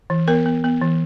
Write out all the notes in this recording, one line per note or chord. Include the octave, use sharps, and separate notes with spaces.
E3
B3 A#4
B3
B3
E3